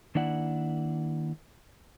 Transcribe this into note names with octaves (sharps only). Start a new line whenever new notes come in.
D#3 A#3 D4 E4 D5 F#5